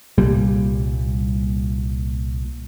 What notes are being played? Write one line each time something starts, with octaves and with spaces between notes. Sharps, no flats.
C2 A#2 G3